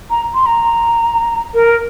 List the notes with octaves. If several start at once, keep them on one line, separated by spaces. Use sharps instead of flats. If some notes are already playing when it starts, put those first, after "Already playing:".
A#5
C6
A#5
A#4